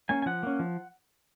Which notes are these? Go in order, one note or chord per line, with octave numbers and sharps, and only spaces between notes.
A#3 C#4 G#5
G#5
F3 F#5
A#3 C#4
F3